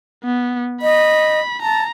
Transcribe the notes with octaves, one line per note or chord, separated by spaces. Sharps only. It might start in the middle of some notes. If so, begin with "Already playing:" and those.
B3
D#5 B5
A5 A#5